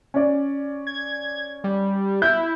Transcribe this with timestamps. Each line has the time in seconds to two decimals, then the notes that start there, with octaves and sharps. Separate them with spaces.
0.14 C#4 D5
0.87 G#6
1.64 G3
2.22 E4 G6